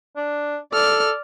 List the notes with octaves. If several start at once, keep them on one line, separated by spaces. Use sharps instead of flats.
D4
A4 D5 F6